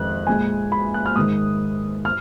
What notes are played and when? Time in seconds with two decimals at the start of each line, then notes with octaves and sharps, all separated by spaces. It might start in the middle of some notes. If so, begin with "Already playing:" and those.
Already playing: F2 D#3 G#3 F#6
0.27 A#2 G#3 G#5
0.72 B5
0.94 F#6
1.06 F6
1.16 G#2 D#3 G#3 D#6
2.05 F6